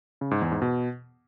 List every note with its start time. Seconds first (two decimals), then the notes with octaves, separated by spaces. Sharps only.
0.21 C#3
0.31 G#2
0.41 E2
0.52 G#2
0.62 B2